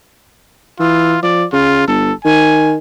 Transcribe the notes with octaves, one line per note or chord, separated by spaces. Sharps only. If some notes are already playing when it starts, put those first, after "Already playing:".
E3 F4
F3 D5
C#3 F4
G1 A4
D#3 G#5